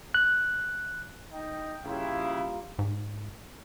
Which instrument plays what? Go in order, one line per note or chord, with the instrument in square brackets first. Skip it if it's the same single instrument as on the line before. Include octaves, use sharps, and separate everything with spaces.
[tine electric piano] F#6
[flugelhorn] D#4 [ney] G5
[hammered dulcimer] G2 A#3 F4 [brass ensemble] C#3 E4 [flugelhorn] F5
[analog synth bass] G#2